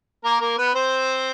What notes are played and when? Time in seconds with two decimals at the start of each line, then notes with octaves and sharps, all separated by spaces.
0.24 A#3 A#4
0.41 A#3 A#4
0.58 B3 B4
0.74 C4 C5